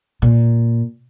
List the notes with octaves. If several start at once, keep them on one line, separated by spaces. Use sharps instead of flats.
A#2